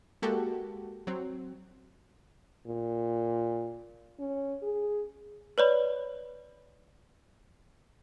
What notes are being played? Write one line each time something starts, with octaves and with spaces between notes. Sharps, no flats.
G#3 A#3 F#4 G4 A4
F#3 C4
A#2
C#4
G#4
B4 C#5 D5 B5